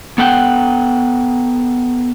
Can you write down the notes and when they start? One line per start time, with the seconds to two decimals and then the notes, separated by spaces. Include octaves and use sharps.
0.18 B3 A4 F#5 G5